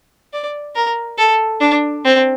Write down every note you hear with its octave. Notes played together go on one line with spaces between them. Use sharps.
D5
A#4
A4
D4
C4